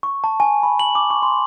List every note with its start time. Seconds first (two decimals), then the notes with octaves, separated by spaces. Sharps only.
0.03 C#6
0.24 A5
0.40 G#5
0.63 B5
0.80 F#7
0.95 D6
1.10 C#6
1.22 C6